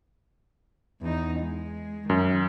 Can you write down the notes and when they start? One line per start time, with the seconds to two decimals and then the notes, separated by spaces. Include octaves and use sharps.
1.01 E2 D#4
1.40 G#3
2.10 F#2 D#3